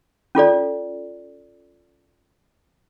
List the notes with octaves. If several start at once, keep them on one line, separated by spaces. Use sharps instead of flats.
C#4 F4 A4 D5